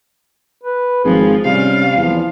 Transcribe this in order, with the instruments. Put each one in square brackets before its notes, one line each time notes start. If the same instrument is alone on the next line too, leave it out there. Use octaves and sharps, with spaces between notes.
[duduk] B4
[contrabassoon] G#1 [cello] F3 [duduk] G#4
[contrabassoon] C3 [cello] G3 F5 [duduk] C#4
[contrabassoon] E2 [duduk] F3